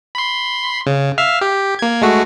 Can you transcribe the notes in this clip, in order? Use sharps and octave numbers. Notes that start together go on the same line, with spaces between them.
B5 C6
C#3
E5 F5 F6
G4
A#3 G#6
G#3 A3 F#4